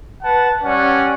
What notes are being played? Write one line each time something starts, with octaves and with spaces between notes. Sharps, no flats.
B4 F#5 A5
G3 C#4 D5 F#5